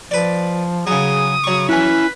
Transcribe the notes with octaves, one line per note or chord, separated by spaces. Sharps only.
F3 B4 D5
C#3 F#3 G#4 D#6
C#3 F#3 C#6
C#4 E4 B4 G#5